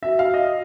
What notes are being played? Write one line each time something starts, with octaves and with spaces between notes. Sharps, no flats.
F#4 E5
F5
D#5